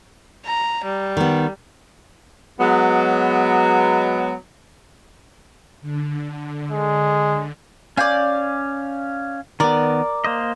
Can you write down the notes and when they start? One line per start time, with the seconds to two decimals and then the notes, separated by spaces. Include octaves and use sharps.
0.46 A#5
0.84 G3
1.17 D#3 B3
2.60 F#3 G#3 B3
5.81 D3
6.71 G#3
7.97 C#4 D5 F5 G#5 G6
9.60 D#3 B3 A#4 D5
10.24 A#3 C5 D#5